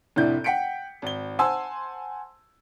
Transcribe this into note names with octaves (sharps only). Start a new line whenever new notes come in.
F1 C2 A2 D4 E4 G6
F#5 G5 B6 C#7 D7
G#1 G7
C5 F#5 G#5 A5 C6 E6